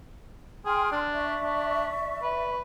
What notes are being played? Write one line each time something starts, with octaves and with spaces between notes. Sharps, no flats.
G#4 G5 C6 F6
D4
D5 E5 C#6
D4
B4